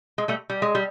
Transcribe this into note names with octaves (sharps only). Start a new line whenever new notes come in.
G#3
G3 A3
G3
G#3
G3